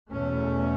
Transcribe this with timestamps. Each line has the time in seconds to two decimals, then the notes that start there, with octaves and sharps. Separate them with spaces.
0.11 E2 B2 A3 C#4